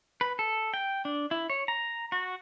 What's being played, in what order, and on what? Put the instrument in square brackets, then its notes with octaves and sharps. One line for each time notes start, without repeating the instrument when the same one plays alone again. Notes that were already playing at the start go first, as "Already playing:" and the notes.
[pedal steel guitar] B4
A4
G5
D4
E4
C#5
A#5
F#4